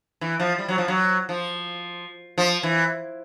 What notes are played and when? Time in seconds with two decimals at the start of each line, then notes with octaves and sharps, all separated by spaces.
0.21 E3
0.40 F3
0.58 G3
0.68 F#3
0.78 F3
0.88 F#3
1.29 F3
2.38 F3
2.63 E3